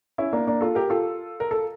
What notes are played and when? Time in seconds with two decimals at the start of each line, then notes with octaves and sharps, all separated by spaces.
0.18 C#4 E4
0.33 A#3 D4
0.47 A#3 D4
0.61 F4 A4
0.75 G4 A#4
0.90 F4 A4
1.40 A#4
1.51 A4